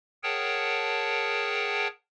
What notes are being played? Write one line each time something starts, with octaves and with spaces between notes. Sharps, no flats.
G#4 A#4 C#5 F#5 G5 A5